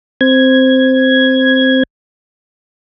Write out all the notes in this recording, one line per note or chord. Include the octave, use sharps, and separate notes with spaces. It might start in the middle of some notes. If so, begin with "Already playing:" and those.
C4 G#6